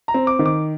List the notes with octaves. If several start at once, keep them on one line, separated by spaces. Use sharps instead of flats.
A#5
C4
D6
D#3
D6